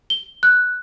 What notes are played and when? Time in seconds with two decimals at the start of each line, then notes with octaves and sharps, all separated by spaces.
0.10 G7
0.43 F#6